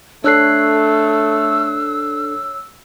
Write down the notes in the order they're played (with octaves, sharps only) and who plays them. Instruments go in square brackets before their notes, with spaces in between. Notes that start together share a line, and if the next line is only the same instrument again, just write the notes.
[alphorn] A3 [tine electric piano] D4 A4 [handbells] C#5 F#6 C7 [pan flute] E6